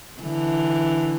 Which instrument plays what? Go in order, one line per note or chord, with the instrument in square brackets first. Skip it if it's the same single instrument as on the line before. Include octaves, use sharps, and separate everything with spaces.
[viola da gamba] D3 E3